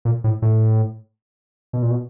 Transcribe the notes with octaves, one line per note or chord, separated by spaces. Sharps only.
A#2
A2
A2
B2
A#2
B2